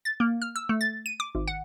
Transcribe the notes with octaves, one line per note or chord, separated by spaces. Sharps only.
A6
A#3
F6
E6
A3
A6
D#7
D6
G#1
F#5